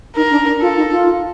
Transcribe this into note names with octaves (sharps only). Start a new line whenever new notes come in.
D#4 A#4
D4
D4
F4 A4
D#4
F4